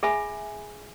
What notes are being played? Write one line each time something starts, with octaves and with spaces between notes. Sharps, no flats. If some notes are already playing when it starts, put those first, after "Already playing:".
G#4 E5 G#5 B5